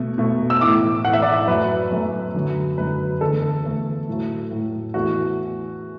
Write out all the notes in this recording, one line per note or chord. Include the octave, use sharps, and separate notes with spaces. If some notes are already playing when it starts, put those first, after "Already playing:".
Already playing: B2 A3
B2 A3
E6
A2 E3 A3 D6
A2 E3 A3 F#5
E5
D5
E5
F#2 F#3 A3 B4
F#2 F#3 A3
F#2 D3 F#3
F#2 D3 F#3 B4
E2 D3 A3 A4
E2 D3 A3
A2 F#3 A3
A2 F#3 A3
E2 E3 A3 F#4